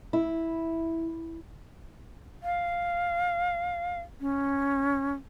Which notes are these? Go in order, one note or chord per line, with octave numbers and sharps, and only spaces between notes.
E4
F5
C#4